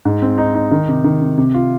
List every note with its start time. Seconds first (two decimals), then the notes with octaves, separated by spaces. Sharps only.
0.05 G#2
0.22 C4
0.38 D#4
0.55 D#4
0.71 D#3
0.88 C3
1.04 D#3
1.22 C3
1.38 C3
1.54 F4